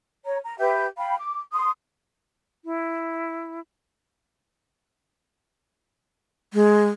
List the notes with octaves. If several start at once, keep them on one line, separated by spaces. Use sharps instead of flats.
C#5 A#5
A#5
G4 B4 E5 G6
F5 G5 B5
D6
C6 D#6
E4
G#3